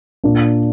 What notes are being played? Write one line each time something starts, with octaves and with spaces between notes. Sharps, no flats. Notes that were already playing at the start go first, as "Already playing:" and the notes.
A#2 A#3 D4